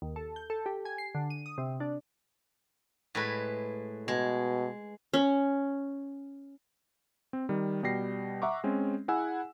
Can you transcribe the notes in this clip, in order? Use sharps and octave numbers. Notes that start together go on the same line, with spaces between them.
D#2
A4
G6
A4
G4
G#5
C7
D3
D#7
D#6
C3
D4
A2 G#3 B4
B2 G#3
C#4
C4
D#3 G3
B2 G3 G5 A#6 C7
E5 F#5 A#5 C#6 D6
G#3 C4 C#4
E4 G#4 F#5 G#5 E6